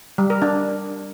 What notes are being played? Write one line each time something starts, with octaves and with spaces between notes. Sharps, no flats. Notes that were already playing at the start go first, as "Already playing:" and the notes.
G3
A#4
D4